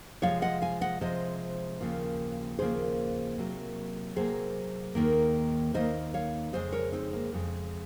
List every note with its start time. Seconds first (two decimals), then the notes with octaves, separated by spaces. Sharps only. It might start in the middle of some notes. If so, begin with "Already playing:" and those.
0.22 C3 F3 G#3 C#5 F5
0.42 D#5 F#5
0.62 F5 G#5
0.81 D#5 F#5
1.01 C3 F3 G#3 C5 D#5
1.81 D#2 C#3 F3 A#3
2.58 D#2 C#3 F3 A#3 G#4 C5
3.38 C3 F#3 A#3
4.16 C3 F#3 A#3 G#4 C5
4.95 D#2 D#3 A#3
5.74 D#2 D#3 A#3 C5 D#5
6.14 C#5 F5
6.53 F2 C#3 G#3 C5 D#5
6.72 A#4 C#5
6.92 C4 D#4
7.13 A#3
7.32 F2 C#3 G#3